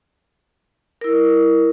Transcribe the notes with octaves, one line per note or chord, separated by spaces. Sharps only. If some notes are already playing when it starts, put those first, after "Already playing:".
E4 A#4